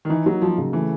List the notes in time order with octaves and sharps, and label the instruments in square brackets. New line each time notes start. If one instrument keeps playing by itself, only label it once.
[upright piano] D#3
[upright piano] E3 [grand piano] D#4
[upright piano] F#3 [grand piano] A#3
[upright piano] F3 [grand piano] F#3
[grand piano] C#3
[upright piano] E3 [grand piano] A3